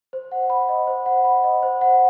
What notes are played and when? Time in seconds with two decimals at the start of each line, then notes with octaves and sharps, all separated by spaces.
0.13 C5
0.32 F#5
0.50 B5
0.69 D#5
0.87 C5
1.06 F#5
1.24 B5
1.44 D#5
1.63 C5
1.81 F#5